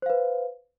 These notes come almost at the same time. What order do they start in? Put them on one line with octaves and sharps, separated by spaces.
C5 F5 B4